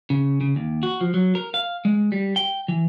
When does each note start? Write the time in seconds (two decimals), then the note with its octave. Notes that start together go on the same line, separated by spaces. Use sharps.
0.10 C#3
0.41 C#3
0.56 D#2
0.83 F#4
1.01 F3
1.14 F#3
1.35 A#4
1.54 F5
1.85 G#3
2.12 G3
2.36 G5
2.68 E3